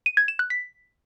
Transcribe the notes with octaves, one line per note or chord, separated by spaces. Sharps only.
D#7
G#6
E7
F#6
B6